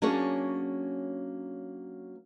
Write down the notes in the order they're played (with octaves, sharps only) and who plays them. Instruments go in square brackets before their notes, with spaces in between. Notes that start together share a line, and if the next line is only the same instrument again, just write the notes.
[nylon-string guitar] F#3 A#3 C#4 D4 G#4 C#5